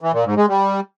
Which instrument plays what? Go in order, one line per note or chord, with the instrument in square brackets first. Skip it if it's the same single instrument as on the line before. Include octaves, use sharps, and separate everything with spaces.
[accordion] E3
A#2
G#2
G#3
G3